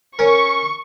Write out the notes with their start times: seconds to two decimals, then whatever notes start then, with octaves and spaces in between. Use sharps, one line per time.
0.19 C#4 A#4 C#6